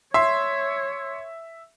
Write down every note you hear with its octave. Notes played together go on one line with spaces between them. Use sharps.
C#5 E5 C6